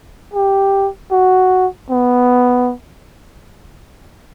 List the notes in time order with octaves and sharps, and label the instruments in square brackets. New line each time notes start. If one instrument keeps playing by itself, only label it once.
[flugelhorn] G4
F#4
B3